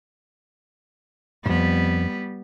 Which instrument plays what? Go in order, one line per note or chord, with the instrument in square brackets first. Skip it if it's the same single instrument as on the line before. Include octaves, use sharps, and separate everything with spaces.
[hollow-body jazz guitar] F2 G#2 [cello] G3 B3